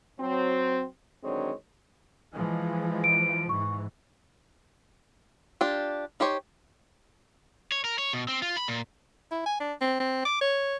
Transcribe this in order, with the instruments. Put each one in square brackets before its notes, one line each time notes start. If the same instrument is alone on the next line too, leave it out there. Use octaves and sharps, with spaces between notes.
[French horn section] F#3 C4
D3 D#3 F#3 G#3 C4 C#5
[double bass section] E3 F3 G#3
[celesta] D7
[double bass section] G#2 E3 [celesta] C#6
[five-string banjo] D4 F4 G4
D#4 G4 C5 C#5
[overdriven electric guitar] C#5
A#4
C#5
B2
C4
F4
B5
A#2
[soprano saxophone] E4
G#5
D4
C4
C4
D6
C#5